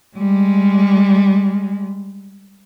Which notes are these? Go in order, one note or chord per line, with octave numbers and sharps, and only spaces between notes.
G3 G#3